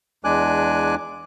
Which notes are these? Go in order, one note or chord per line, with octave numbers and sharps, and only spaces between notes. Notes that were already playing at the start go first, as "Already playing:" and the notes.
E2 G#3 D4 G#5 D6 F#6